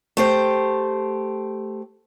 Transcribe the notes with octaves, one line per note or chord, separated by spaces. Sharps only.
A3 G4 C5